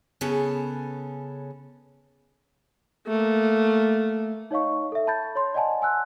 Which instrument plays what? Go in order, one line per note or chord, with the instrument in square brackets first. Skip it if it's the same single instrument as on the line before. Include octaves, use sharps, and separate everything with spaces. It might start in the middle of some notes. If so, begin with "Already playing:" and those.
[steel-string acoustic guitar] C#3 B3 C#4 G#4 A4
[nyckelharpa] A3 A#3
[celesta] D#4 C#5 D#5 F5 C#6
A4 E5
A5 B5 G6 A6
C#5 C6
D5 D#5 F#5 G#5 A5 C6
G#5 E6 F#6